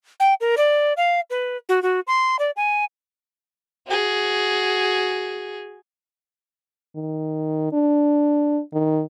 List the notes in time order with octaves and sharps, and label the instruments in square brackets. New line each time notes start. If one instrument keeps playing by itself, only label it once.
[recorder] G5
A#4
D5
F5
B4
F#4
F#4
C6
D5
G#5
[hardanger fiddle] F#4 G#4
[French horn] D#3
D4
D#3